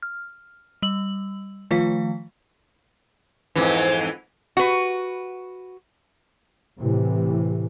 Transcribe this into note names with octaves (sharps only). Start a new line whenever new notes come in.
F6
G3 E6 F#7
D#3 F3 A3 F4 F5 B6
F2 G#2 E3
F#4 B4
A2 C3 E3